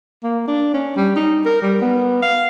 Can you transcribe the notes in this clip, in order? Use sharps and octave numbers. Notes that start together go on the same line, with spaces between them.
A#3
D4
C#4
G3
D#4
A#4
G3
B3
F5